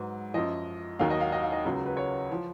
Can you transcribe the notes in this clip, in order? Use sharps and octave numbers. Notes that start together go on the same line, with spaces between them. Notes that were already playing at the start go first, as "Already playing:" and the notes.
Already playing: G#2 F#3 B4
F#2 F3 D#5
D#2 D#3 F#3 F5
D#5
F5
D#5
F5
D#5
C#2 C#3 F#3
B4
C#5
F3